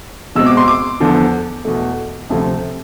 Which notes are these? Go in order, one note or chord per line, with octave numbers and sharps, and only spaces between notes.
B2 G#3 C4 E6
D6
C6
D6
E2 D3 F3
E2 B2 A3
D2 C3 F3 A3